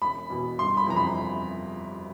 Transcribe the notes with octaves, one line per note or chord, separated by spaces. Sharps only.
E1 B5
E2 B2
G1 C6
B5
F2 C3 E3 A#5
B5